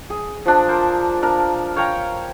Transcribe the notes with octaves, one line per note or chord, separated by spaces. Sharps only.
G#4
F3 D4
A#4 C5
D4 A#4
C#5 F5 G5 A#5